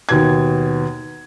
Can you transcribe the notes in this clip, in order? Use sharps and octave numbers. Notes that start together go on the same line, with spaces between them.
D#2 B2 G#6